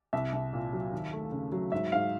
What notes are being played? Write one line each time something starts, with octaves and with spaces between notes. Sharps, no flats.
C2 E5
C2
A#2
F#3
D#2
A3
C#3
F#3
G#2 E5
G#2 F5